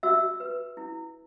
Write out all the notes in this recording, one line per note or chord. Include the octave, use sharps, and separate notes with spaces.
F#4 E5 E6
B4
E4